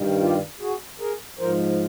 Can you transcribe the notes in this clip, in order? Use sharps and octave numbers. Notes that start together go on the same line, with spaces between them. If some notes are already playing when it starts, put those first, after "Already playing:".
Already playing: G2 D#3 G3
F4 G4
F#4 G#4
G#4 A#4
G#2 F3 A#4 C5